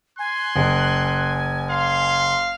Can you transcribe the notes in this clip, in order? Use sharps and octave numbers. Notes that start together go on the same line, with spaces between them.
G#5 C6 F#6
F#1
F5 C6